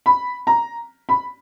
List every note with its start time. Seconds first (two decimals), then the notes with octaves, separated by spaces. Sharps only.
0.06 B5
0.47 A#5
1.09 B5